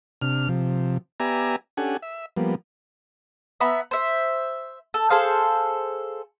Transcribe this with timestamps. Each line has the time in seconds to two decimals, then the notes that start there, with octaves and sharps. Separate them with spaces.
0.22 C3 D4 F6
0.48 C3 F3
1.20 B3 G4 D5 E5 G#5 A#5
1.77 C#4 D4 G4 A4 F#5 G#5
2.02 E5
2.37 F3 G3 A#3 B3
3.60 B3 E5 A#5 B5
3.91 C5 E5
4.94 A4
5.10 G#4 A4 C5 F5